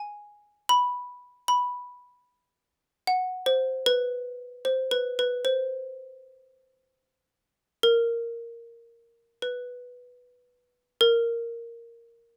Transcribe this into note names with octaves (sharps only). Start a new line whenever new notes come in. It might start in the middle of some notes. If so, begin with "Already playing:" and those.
Already playing: G#5
B5
B5
F#5
C5
B4
C5
B4
B4
C5
A#4
B4
A#4